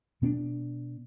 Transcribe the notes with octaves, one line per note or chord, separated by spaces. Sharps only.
B2 B3 C4 D4